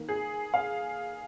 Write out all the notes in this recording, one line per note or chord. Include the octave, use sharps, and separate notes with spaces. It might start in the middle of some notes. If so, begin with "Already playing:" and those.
Already playing: D#3 A#3
G#4
F5